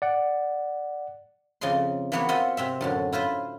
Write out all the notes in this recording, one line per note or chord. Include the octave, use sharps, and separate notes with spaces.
D5 F#5
F2 C#3 D5 D#5 C6
E3 A#3 B3 F#4 C#5
C4 F4 C5 D#5 E5 F#5
C3 C4 E5
F#2 A2 D3
E4 F4 B4 C5